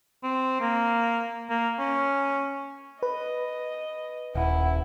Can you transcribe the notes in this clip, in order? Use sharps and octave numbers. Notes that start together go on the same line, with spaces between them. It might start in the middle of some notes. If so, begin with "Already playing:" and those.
C4
A#3
A#3
C#4
B4 D#5
D#1 E4 F#5